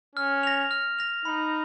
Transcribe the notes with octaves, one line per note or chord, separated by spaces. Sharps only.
C#4 F6
A#6 F7
F6
A#6 F7
D#4 B5